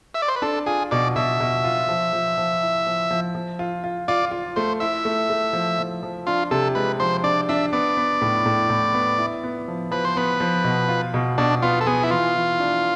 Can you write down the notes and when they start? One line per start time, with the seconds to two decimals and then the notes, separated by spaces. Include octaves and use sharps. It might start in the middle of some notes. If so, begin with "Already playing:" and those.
0.14 E5
0.22 D5
0.28 C5
0.36 B4
0.42 D4 A4
0.66 F4 G#4
0.91 B2 D5
1.16 B2 E5
1.40 B2
1.64 F4
1.89 F3
2.13 F3
2.37 F3
2.62 E4
2.87 F3
3.11 F3
3.35 F3
3.59 F4
3.84 F4
4.08 F4 D5
4.31 F4
4.56 A3 C5
4.80 E4 E5
5.05 A3
5.30 A3
5.53 F3
5.78 F3
6.03 F3
6.27 D4 F4
6.51 C3 A4
6.75 G#3 B4
7.00 F3 C5
7.24 D4 D5
7.49 D4 E5
7.72 B3 D5
7.97 B3
8.21 A2
8.46 A2
8.70 A2
8.94 B3
9.18 E4
9.44 B3
9.68 F3
9.91 F3 B4
10.05 C5
10.16 B3 B4
10.40 F3
10.64 B2
10.89 F4
11.14 B2
11.38 B2 D4
11.62 B3 F4
11.81 A4
11.86 B3 G#4
12.03 E4
12.10 E3 F4
12.36 E3
12.60 D4